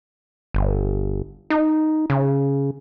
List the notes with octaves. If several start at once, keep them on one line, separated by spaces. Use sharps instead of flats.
G1
D#4
C#3